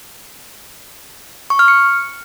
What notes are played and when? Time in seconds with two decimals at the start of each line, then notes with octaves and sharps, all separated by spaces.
1.50 C#6
1.59 F6
1.68 C#7